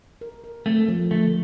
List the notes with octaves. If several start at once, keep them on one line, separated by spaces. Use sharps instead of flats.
A#4
A#4
A3 C4
F3
D3 A3